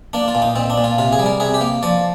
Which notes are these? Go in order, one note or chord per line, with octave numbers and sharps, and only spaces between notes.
A#3 D4
F4
A#2
D#4
A#2 C4
D4
A#2
F4
C3 F4
G#4
G3
A#4
C3 G#4
G4
A#3
F3 D5